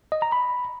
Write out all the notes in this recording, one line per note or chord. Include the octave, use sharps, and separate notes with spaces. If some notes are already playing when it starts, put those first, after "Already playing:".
D#5
A#5
B5